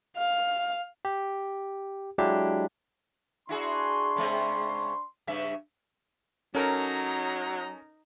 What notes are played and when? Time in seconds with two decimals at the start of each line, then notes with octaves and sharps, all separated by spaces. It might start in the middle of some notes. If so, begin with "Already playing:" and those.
0.17 F5
1.05 G4
2.18 F#3 G#3 D4 E4 G4
3.49 D4 E4 F#4 G#4 B5 C6
4.16 C#3 G#3 C4
5.27 G2 C#3 E5
6.55 F#3 C#4 D#4 A4 A#4 A#5